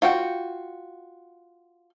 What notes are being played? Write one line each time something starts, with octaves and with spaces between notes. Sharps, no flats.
F4 F#4 G5